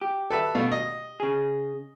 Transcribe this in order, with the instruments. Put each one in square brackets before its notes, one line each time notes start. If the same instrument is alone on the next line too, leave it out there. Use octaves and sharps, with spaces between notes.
[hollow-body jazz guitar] G4
[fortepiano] A4 B4 E5
B2 A3 F5
D#5
[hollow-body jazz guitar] C#3 G#4